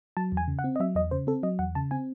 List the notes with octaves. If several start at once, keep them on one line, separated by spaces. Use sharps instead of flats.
F#3 A5
E2
G#5
C#3
F#5
C4
D#5
F#3 E5
E2 D#5
C#3 C5
C4 A4
F#3 D#5
E2 F#5
C#3 A5
C4 G#5